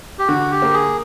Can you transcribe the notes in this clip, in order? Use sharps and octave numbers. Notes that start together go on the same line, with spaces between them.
G4
D3 F#4
G4
A#3
G#4